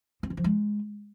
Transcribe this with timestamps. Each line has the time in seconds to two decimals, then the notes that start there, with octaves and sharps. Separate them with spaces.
0.23 C4
0.30 E3
0.37 F3
0.44 G#3